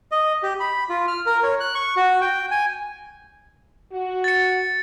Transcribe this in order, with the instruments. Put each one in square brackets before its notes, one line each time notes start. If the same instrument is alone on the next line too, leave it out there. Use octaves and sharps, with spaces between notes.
[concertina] D#5
G4
B5
F4
F6
A#4
C#5
F#6
C#6
F#4
G5
G#5
[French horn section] F#4
[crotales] A6 C#7